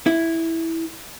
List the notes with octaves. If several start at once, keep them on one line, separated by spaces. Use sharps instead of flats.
E4